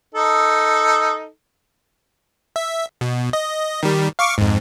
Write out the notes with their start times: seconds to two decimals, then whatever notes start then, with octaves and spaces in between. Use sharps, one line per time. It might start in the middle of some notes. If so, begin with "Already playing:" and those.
0.15 D#4 A4
2.56 E5
3.01 B2
3.33 D#5
3.83 D#3 G3
4.19 F5 C#6 D6
4.38 F2 G#2